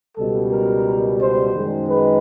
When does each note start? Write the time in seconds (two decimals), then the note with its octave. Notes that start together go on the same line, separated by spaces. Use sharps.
0.17 C#2 B2 G3 A4
0.51 A#4
1.20 C5
1.53 F#2 D#3 G#3
1.88 B4